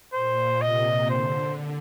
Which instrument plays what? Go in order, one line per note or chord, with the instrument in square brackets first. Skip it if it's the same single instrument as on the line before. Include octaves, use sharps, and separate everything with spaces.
[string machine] A#2 [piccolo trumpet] C5
[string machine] C3 [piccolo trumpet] D#5
[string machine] D3 [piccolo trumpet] C5